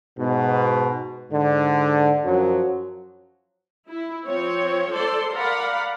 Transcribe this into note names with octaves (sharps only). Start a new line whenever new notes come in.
G#2 B2
G#2 D3
F#2 F3 F#3
E4
F3 C4 C#5
A4 C5 D5 C6
A#4 D5 F5 F#5 A#5 B5